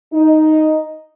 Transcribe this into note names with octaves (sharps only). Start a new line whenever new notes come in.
D#4